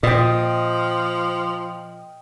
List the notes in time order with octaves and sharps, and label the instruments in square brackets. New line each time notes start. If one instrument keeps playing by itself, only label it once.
[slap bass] A#2 [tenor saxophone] F3 [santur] D#5 G5